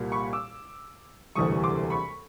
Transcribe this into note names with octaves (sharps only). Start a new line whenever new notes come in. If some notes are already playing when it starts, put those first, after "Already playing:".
Already playing: C2 A#2 G3 A#3
B5 C#6
D6 E6
E1 D2 C3 E3 G3 C#6 D#6
C6 D6
B5 C#6